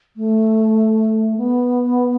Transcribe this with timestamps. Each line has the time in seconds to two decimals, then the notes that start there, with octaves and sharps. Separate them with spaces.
0.17 A3
1.37 B3